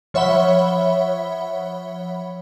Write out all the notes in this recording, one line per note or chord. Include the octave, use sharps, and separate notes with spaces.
F3 C#5 E5 F#5 B5 G7